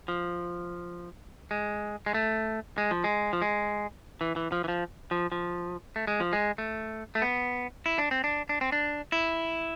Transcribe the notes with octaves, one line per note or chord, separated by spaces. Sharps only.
F3
G#3
G#3
A3
G#3
F3
G#3
F3
G#3
E3
E3
F3
E3
F3
F3
F3
A3
G#3
F3
G#3
A3
A3
B3
E4
D4
C4
D4
D4
C4
D4
E4